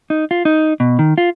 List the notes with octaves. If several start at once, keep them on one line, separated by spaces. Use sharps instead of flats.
D#4
F4
D#4
B2
D#3
F4